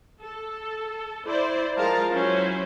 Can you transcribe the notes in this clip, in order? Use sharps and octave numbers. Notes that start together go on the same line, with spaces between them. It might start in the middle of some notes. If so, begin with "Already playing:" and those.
A4
E4 C5 D5
F3 G#3 A#4 F5 A5 A#5
F#3 C#4 E4 C5